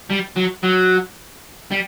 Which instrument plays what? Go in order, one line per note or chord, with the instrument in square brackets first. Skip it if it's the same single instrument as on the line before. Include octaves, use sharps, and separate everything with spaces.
[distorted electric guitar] G3
F#3
F#3
G3